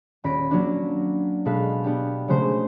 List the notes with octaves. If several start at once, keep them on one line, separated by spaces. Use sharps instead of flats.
D#1 C#4 B5 A#6 D7 D#7
F#3 A#3 D4
B2 G#3 A4 B4 F5
B3 D4 G4
C#3 F#3 G#3 A3 C5